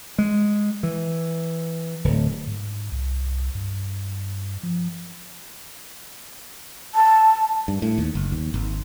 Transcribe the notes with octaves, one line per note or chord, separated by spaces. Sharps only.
G#3
E3
D1
G#2
C2
G2
F3
A5
G2
A2
D#2
F#1
D#2
G#1